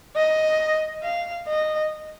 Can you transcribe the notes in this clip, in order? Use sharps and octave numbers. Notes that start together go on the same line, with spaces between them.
D#5
F5
D#5